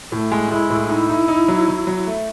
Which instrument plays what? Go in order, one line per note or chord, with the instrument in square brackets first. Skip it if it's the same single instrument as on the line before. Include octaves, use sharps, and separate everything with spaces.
[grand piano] A2 [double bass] A3
[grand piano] G#3
[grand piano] G#3 [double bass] E4
[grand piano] A2
[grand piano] D#4 [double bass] E4
[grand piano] D#4
D#4
F#3
F#3
F#3
A3